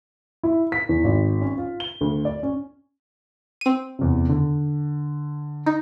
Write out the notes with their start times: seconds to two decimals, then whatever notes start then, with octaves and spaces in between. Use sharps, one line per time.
0.43 E4
0.72 B6
0.89 E2
1.04 G#1
1.42 C#4
1.58 F4
1.80 G7
2.01 D2
2.25 D5
2.43 C#4
3.61 C4 D#7
3.99 E2 C3
4.29 D3
5.66 D#4